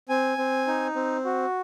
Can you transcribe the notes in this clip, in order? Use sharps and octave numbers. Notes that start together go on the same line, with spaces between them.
C4 G#5
C4
D#4
C4
F#4